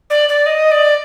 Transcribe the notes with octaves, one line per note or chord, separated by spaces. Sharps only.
D5
D5
D#5
D5